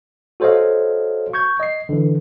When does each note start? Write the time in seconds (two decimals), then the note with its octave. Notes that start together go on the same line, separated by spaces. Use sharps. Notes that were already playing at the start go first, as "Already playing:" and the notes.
0.40 F#4 A4 C5 C#5 D#5 F5
1.34 C#6 G6 G#6
1.60 D#5 C7
1.89 D3 E3